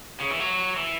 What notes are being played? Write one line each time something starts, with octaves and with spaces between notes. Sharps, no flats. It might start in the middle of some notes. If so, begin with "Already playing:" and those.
C#3
E3
F#3
E3